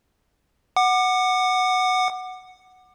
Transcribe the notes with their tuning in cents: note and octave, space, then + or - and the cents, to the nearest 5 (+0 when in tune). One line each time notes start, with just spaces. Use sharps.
F#5 +0 D6 +30